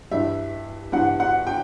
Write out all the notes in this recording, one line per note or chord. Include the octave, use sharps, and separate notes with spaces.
G2 E3 E5
G2 E3 F#5
F#5
G5